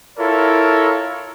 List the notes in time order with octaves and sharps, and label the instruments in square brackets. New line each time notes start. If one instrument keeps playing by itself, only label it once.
[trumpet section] E4 F4 A4 A#4 C#5